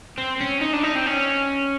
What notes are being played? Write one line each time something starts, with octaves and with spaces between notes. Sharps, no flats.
C4
C#4
D#4
D4
D#4
C4
C#4